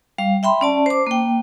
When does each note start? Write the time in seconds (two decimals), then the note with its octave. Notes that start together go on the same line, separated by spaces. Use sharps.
0.18 G3 F5
0.43 E5 G5 B5 C6
0.61 C#4 D5 A5
0.86 C5 D6
1.07 A#3 G5